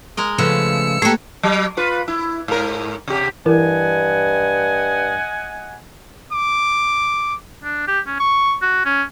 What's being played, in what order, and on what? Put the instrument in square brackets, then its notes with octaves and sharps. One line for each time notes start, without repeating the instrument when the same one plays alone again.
[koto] G#3 A#4 D#5
[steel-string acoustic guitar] C#3 F3 A3 [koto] B3 [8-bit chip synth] E6 C#7
[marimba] A3 A#3 [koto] F#4 C#5 [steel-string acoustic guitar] G4 A4
[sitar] F#3
F4 B4
E4
G#2 A#4
C3 G4
[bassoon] G2 [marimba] E3 E4 A#4 [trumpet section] D#5 F#5 G#5
[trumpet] D6
[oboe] D4
G4
C#4
C#6
F#4
C#4